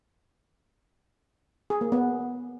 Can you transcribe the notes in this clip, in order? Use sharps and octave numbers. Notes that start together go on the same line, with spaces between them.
G#4
A#3
B3